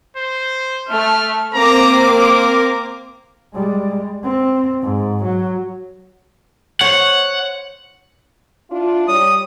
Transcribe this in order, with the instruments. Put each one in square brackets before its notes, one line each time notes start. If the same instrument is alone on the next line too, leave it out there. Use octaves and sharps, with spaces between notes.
[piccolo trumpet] C5
[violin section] A3 [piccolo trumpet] F6
[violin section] A#3 C4 D6 [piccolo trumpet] A#5
[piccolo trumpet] A#4
[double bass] G3 G#3
C4
G#2
F#3
[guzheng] C5 C#5 [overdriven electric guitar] F#5
[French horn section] D4 E4 F4
[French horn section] G3 C#5 [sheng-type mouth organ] D#6